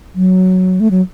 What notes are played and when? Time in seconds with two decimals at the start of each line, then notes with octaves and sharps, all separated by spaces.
0.15 F#3
0.80 A3
0.91 F#3